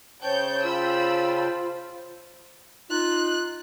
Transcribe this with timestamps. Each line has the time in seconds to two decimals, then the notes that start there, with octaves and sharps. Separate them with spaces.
0.23 C#3 C5 C#5 G5 A5 G6
0.65 F4 B5 E6
2.91 D#4 F4 F#6